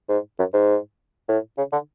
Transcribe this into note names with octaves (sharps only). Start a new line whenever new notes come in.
G#2
F#2
G#2
A2
C#3
D3